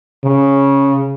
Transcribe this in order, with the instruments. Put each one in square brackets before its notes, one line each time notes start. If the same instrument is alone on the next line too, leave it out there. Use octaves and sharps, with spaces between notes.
[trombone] C#3